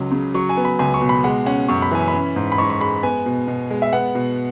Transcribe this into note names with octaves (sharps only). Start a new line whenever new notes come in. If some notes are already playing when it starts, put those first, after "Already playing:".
Already playing: C#2 F#3 C#4
C#3
F#3 C#6
G#5
B3
B5
C#2 G#5
C#6
B2
B5
G#3 F#5
C#4 F#5
F#2 C#6
B5
E3 G#5
B5
C#4
G#2
B5
G#2 C#6
C#6
G#3 B5
B3 G#5
B2
B2
G#3
E5
B3 F#5
B2